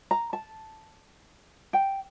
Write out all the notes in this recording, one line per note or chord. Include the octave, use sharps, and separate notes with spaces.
A#5
A5
G5